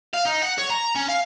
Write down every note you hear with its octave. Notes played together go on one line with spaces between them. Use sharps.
F5
D#4
F#5
C#5
A#5
C#4
F5